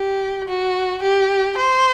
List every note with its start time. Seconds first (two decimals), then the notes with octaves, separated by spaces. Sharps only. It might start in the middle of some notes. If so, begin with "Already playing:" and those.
Already playing: G4
0.48 F#4
1.02 G4
1.57 C5